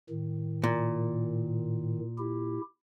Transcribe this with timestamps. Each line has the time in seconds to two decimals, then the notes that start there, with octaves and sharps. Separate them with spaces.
0.10 A2 D#3
0.64 A#2
2.18 E4 G4